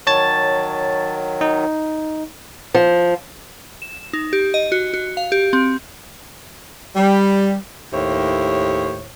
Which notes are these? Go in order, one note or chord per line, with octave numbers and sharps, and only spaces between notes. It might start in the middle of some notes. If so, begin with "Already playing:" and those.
D#3 F#3 C#5 A5 A6
D#4
F3
E7
D#4
G4
D#5
F#4
F#4
F5
G4
C4
G3
D#2 A2 E4 C5 C#5